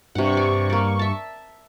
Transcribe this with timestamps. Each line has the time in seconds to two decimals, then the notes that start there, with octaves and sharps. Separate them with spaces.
0.15 G2 C3 F#5 C#6
0.37 D5
0.70 A#3 D5
0.99 E5 A5